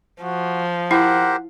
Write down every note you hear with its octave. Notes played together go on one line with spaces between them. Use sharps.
F3 F#4
E4 G4 A#4 C5 F#5